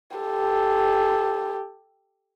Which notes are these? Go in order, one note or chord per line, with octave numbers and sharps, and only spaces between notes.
G4 A4